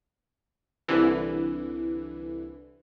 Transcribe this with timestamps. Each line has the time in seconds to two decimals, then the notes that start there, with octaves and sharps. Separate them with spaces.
0.88 C2 D3 E3